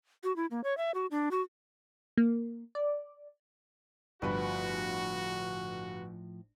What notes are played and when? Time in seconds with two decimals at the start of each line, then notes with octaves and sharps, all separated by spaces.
0.24 F#4
0.36 E4
0.51 A#3
0.64 C#5
0.77 E5
0.94 F#4
1.11 D4
1.31 F#4
2.17 A#3
2.75 D5
4.22 G1 A2 F3 F#4 B4